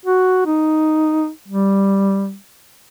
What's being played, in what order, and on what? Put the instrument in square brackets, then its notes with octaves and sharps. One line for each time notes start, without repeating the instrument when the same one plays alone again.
[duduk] F#4
D#4
G3